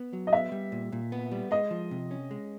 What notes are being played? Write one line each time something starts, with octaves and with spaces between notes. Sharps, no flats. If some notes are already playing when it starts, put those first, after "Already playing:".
Already playing: B3
F#3
D#5
B3 E5
G3
A#2
A#2
B3
G3
G#3 D#5
F3
C3
C#4
G#3